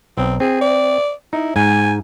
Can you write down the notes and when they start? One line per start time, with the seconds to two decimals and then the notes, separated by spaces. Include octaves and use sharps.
0.17 B1 C4
0.40 C4 G#4
0.61 D5
1.33 D#4 E4
1.56 G#2 G#5